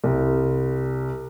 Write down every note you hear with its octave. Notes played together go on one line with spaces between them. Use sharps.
C2